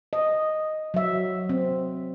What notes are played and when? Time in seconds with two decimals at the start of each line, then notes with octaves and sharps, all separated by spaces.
0.13 D#5
0.94 F#3 E5
1.49 C4